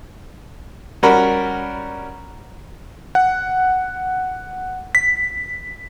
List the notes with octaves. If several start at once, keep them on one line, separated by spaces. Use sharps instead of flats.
G3 C#4 F#4 A#4 B5
F#5
B6